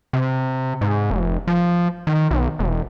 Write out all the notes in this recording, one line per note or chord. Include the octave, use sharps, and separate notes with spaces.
C3
G#2
F1
F3
D#3
B1
E1